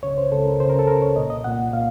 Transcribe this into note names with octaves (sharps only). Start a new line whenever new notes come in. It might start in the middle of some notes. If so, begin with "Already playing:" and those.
C#2 C#3 C#5
C5
C#2 C#3 A4
A#4
C#2 C#3 C5
A#4
A4
C#2 C#3 A#4
C#5
C2 A#2 D#5
D#5
C2 A#2 F#5
A#2 F5